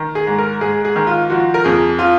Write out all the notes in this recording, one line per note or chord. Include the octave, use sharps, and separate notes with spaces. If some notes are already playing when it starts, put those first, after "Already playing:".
Already playing: D#3
G#4
G#2
A#4
G#2 G#4
G#4
D#3
F4
F3 F#4
A#4
F2 G#4
F3 F4